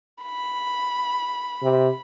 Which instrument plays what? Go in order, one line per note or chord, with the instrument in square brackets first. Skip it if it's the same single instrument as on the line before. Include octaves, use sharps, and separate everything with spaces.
[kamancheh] B5
[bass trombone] C3